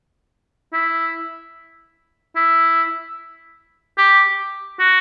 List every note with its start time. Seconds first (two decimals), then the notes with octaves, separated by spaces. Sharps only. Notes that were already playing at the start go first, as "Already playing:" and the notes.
0.73 E4
2.36 E4
3.98 G4
4.79 F#4